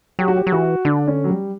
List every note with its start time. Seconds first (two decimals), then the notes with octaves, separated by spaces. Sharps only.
0.19 F#3 G4
0.28 F#4
0.36 G4
0.47 F#3
0.52 E3 F#4
0.85 D3 D4
1.07 C#4
1.24 F#3
1.29 G3